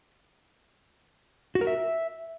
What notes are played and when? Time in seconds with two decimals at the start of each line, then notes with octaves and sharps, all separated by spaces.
1.55 F#4
1.61 A#4
1.67 E5